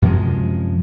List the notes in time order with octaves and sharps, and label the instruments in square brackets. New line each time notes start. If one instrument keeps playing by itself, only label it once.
[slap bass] F#2 C3 F3 G#3